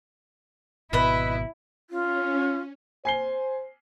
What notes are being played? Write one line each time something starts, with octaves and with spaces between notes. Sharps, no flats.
G#1 B2 E4 B4 D#5 E5
C#4 F4
C5 G#5 C7 G7